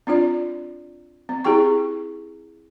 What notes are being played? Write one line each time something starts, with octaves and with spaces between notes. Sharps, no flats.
C4 D4 F4 D5
C4
C4 E4 G4 G#4 G5 C#6